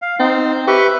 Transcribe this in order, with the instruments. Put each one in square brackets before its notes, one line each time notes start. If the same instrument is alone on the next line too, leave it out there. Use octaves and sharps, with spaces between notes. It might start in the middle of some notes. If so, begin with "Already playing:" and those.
[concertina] F5
[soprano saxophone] C4 [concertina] D#4
[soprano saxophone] G4 [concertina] B4 E5 C#6